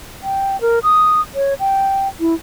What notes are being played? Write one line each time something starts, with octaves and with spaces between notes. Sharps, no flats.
G5
A#4
D#6
C#5
G5
E4